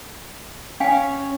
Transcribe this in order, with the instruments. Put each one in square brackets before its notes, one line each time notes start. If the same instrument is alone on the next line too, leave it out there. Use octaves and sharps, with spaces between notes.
[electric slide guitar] C#4 C#5 [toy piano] F5 G5 G#5